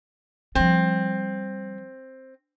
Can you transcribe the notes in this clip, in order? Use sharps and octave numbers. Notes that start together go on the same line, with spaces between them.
F3 G3 C4